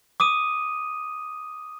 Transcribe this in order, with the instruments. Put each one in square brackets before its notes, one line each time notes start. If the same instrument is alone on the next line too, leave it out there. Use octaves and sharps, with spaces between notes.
[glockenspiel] D6 D#6 D#7